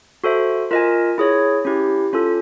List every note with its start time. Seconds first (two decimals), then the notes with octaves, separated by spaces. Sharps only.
0.24 F#4 A4 C5 E5
0.71 F4 A#4 D#5 G#5
1.18 E4 G#4 C#5
1.65 C#4 E4 G4
2.13 C#4 F4 A4